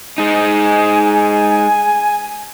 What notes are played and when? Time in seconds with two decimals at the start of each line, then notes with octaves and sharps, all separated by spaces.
0.18 G#3 D#4 G#5